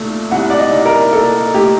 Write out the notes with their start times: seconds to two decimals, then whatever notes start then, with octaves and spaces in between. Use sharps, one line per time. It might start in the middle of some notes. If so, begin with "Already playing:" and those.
Already playing: C2 A#2 A3
0.31 C2 F#5
0.50 D5
0.59 D#5
0.72 C2
0.85 A#4
1.13 A#2 A4
1.54 A3 G4